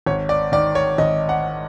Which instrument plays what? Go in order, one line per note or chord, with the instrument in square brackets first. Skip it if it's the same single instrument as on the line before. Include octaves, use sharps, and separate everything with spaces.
[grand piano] G#1 C#5
D5
D#3 D5
C#5
G#1 D#5
F#5